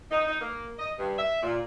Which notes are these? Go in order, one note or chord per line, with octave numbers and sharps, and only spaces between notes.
D#4
D#4
A#3
D#5
G2
E5
A#2